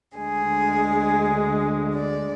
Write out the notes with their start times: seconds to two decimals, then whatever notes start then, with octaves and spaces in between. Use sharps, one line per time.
0.17 D2 D3 G#3 G#4
1.93 D5